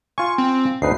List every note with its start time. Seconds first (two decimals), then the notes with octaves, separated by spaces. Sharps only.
0.18 F4 G#5 C#6
0.38 C4
0.82 D2 D#4 B4 C7